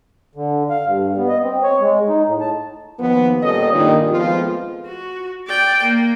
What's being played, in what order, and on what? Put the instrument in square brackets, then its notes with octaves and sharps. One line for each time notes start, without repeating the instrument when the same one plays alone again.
[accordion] D3
F5
G2
B3
D#5
C4
C#5
G#3
D#4
A2
A5
[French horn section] D#2 F3 B3
A#2 G3 C#4 A4 D#5
G2 A#2 D#3
F3 G#3 A3 B3 C4 F4
[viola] F#4
D5 G5
A#3